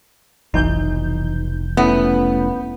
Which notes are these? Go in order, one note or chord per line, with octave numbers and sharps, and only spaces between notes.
F1 B1 E3 D#4 G6
A3 B3 C#4 E4